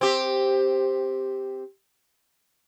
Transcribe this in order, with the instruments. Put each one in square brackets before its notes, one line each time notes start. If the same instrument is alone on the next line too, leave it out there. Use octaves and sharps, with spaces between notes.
[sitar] C4 G4